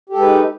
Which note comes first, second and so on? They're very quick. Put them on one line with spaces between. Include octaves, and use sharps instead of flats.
G4 A4 G#3 B4 D#4